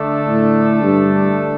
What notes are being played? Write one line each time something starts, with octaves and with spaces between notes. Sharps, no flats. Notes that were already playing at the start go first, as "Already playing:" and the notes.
Already playing: D3 A3 D4 A4
A2
G2